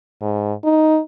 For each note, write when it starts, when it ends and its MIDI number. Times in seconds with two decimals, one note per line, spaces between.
0.21 0.53 44
0.65 0.99 63